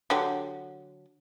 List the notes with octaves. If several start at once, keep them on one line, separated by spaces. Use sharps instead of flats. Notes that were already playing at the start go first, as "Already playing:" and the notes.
D3 F#3 G4